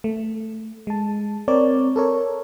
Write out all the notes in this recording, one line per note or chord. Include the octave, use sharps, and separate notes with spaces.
A3
G#3 A5
C4 A#4 C#5 D5
A4 A#4 C#5